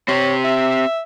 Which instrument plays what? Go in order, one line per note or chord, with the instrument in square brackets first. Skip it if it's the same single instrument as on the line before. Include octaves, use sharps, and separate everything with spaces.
[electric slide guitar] C4 G4 [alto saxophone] C#5
[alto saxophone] E5